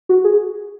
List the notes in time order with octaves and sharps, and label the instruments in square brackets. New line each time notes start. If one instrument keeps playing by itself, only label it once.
[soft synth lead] F#4
G#4